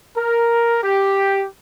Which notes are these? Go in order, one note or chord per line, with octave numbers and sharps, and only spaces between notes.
A#4
G4